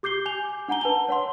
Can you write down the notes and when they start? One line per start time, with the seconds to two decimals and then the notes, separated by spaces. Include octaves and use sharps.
0.03 G4 D6 G6 C7 G7
0.26 G#5 G6 F7 G7
0.68 D4 F#5 G#5 A#5 G7
0.81 B4 A5 G7
1.09 C#5 F#5 C6